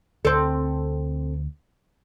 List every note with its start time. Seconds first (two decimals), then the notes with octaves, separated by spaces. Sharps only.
0.25 D2 C4 A4